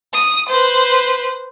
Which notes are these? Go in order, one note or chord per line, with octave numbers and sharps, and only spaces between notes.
D#6
B4 C5